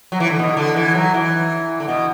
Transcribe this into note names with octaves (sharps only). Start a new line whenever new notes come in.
F#3
E3
D3
B2
D3
E3
F#3
E3
D3
B2